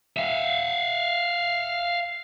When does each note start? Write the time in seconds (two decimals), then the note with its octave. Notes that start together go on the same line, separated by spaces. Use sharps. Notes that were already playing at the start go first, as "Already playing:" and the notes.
0.17 E5 F5